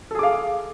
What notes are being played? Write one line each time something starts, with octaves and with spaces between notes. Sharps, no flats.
G#4 A4 F5 D6